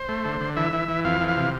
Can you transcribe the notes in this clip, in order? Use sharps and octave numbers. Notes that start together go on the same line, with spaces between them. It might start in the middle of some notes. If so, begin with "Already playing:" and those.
Already playing: C5
A3
D3
D3
E3 E5
E3
E3
F2 F5
E3
F5
C3